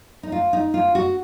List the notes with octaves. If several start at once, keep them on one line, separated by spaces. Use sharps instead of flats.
D#4
F4
D#4
F4
F#4